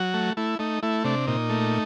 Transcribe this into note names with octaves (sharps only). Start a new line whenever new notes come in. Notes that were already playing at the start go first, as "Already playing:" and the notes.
Already playing: F#3 F#4
A3
A3 E4
A3 D#4
A3 E4
C3 D4
A#2 D#4
A3